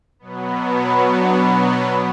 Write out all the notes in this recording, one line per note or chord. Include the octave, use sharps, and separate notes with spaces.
B2 F#3 B3
D4